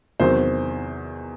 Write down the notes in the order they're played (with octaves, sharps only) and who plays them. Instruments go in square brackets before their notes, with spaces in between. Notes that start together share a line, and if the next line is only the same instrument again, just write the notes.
[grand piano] E2 C3 D#3 F#3 C5